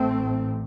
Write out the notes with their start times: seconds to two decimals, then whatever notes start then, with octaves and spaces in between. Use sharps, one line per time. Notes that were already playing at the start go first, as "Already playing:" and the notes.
Already playing: A1 A2 A3 C4